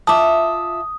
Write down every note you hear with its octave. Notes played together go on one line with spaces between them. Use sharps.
F4 E5 A5 D6 D#6